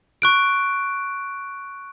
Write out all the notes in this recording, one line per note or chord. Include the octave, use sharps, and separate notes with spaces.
C#6 F#6 D7